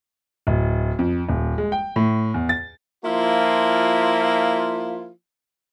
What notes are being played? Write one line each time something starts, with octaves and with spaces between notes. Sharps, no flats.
D1
F2
D#1
G#3
G5
A2
E2
A6
F3 A#3 E4 F4